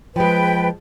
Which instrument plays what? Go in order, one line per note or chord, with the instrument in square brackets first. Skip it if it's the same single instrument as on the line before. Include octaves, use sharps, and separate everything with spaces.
[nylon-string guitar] F3 G#3 [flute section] B4 G5